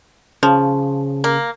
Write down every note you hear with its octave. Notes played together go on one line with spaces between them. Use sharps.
C#3 F3
A#3